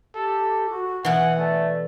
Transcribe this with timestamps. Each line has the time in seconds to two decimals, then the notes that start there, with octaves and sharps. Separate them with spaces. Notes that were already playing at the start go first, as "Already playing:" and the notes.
0.15 G4 A4
0.69 F#4
1.05 B2 E3 F#5 G#5
1.38 A3 D5